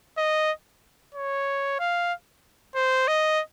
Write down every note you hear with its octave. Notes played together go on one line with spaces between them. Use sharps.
D#5
C#5
F5
C5
D#5